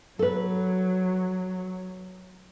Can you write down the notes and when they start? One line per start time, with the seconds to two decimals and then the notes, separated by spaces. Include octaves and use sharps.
0.19 F#3 A4 B4